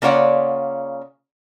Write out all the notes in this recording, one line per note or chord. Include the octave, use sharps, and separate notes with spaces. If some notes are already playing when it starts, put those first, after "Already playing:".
C#3 A#3 F4 C#5 D5 F#5